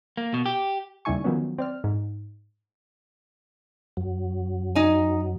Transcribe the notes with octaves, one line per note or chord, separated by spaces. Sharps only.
A#3
B2
G4
D#2 C#3 G3 E4 G#5 C#6
D#3 F3 F#3 B3 C#4
C4 D5 F6
G#2
F#2 F#3
D#4 G#5